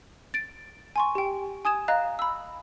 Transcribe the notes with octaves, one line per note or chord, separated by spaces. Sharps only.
A6 D7
G#5 C6 C#6
G4 G5
G#5 D#6 G#6 E7
D#5 F5 A#5 F#6
B5 E6